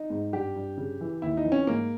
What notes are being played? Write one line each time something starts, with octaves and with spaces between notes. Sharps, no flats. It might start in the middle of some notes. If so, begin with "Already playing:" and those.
Already playing: D#4
G#2
G2 G4
G2
C#3
E3
D#2 E4
D#4
E3
C#4
G#2 A#3